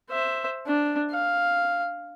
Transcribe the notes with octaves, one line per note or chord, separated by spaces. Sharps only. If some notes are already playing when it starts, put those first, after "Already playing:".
C5 E5
D4
F5